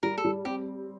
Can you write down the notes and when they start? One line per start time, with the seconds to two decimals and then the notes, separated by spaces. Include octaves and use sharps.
0.03 G3 A#4
0.18 A4
0.25 G3
0.45 C4 G4